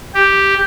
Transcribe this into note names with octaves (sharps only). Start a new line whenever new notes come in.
G4